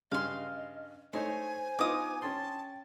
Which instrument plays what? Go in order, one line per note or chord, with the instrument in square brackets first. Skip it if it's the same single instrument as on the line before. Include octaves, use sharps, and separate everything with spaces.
[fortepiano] G2 C#3 [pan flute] D#5 [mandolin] F5 C6
[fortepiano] A3 D#4 C#5 [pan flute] C5 [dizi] G#5 [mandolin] C6
[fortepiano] B3 D#4 F4 [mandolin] D6 D#6
[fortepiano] C#4 C6 [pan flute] G5 [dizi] A5